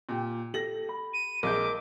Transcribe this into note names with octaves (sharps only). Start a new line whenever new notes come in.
A#2 G4
G4 A4 A#6 F#7
B5
D#7
A#1 G#3 A#4 D6 G6